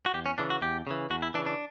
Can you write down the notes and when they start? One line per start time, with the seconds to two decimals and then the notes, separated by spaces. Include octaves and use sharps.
0.06 F#4
0.14 E2 G4
0.26 C#4
0.38 C#3 E3 D4
0.50 F#4
0.62 E2 G4
0.87 C#3 E3
1.10 E2 F#4
1.22 E4
1.34 E3 D4
1.38 C#3
1.46 D4